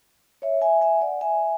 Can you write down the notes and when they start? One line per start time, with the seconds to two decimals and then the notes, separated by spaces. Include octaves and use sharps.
0.42 C#5 E5
0.62 E5 G#5
0.81 E5 G#5
1.01 D5 F#5
1.21 E5 G#5